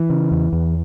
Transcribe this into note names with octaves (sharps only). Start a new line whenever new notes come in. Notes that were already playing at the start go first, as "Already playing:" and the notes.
Already playing: E3
C#3
E2
E2